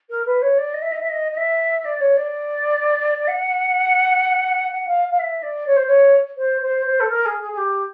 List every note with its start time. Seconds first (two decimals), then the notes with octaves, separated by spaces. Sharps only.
0.10 A#4
0.25 B4
0.42 C#5
0.58 D5
0.73 D#5
0.82 E5
0.91 D#5
1.00 E5
1.09 D#5
1.31 D#5
1.37 E5
1.84 D5
2.00 C#5
2.16 D5
3.27 F#5
4.70 F#5
4.87 F5
5.11 F5
5.19 E5
5.42 D5
5.66 C#5
5.76 C5
5.86 C#5
6.37 C5
6.61 C5
6.86 C5
7.00 A4
7.09 A#4
7.25 G#4
7.41 G#4
7.52 G#4
7.57 G4